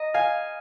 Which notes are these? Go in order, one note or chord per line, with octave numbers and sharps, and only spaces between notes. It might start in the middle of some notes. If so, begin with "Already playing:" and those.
Already playing: D#5 A#5
F5 G#5